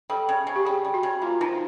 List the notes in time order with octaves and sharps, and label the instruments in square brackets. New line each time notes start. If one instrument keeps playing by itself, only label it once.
[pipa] G3 [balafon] A4
[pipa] C#3
C#3
[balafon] G4
[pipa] G3 [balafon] G#4
[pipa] G3
[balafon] F#4
[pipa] C#3
[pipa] A#3 [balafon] F4
[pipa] F3 [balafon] D#4
[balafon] D#4